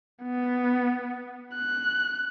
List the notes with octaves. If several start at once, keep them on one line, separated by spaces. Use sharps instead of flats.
B3
F#6